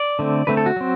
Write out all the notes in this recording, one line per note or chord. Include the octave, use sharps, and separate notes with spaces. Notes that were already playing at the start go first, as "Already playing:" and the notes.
Already playing: D5
D3 A3 C4
D3 A3 C4 B4
A4
F#4
F#3 C4